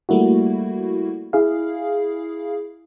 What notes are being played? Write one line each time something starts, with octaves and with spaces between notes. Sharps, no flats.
G3 A3 A#3 E4 F#4
E4 G#4 F5